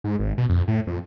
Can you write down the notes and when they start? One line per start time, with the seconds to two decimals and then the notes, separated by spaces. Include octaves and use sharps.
0.04 G#2
0.19 G#1
0.38 B2
0.49 F2
0.68 A2
0.87 F2